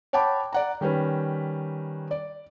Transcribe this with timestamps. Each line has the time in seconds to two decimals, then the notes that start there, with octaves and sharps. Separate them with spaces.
0.13 C#5 F#5 G5 A5 B5 D6
0.53 D5 F#5 A#5
0.81 D#3 G3 C#4 B4
2.11 D5